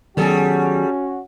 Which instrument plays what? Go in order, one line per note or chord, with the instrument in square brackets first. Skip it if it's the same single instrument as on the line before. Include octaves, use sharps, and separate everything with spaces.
[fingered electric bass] D#3 F#3 B3 [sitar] G3 G#4 A4 [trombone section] C#4 F#4